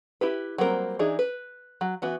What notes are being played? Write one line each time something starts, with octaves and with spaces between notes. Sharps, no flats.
E4 G4 B4
F#3 G3 A#3 C4 A#4
E3 D4 D#4 G#4
B4
F#3
E3 B3 F#4